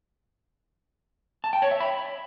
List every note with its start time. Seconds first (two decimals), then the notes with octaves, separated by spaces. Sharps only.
1.44 A5
1.53 G5
1.62 C#5
1.71 E5
1.80 B5